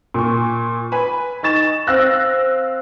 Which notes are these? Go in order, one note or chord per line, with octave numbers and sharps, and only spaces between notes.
A#2 C#6
B4 G#5 B5
D#4 C#6 A6 E7
C4 F5 E6 F#6 A#6